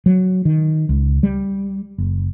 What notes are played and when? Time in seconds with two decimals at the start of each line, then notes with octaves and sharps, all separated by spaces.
0.06 F#3
0.45 D#3
0.89 C#2
1.23 G3
1.98 F#1